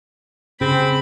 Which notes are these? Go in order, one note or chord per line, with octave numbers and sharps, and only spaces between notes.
C#3 C4 G4 G#4 B5